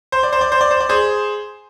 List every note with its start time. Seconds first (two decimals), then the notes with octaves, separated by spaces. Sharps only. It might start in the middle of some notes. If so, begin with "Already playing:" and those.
0.12 C5
0.23 D5
0.33 C5
0.41 D5
0.52 C5
0.61 D5
0.71 C5
0.80 D5
0.89 G#4 C5